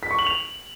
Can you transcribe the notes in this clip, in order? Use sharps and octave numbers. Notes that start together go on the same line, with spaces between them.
B6
C#6
F#7
F7